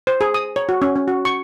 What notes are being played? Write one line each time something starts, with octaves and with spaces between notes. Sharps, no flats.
C5
G#4
D#6
C#5
F#4
C#4
C#4
F#4
C#6